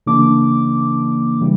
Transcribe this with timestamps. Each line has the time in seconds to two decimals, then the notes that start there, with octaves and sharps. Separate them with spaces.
0.06 C#3 E3 A#3 D4 D6
1.40 C#3 E3 G3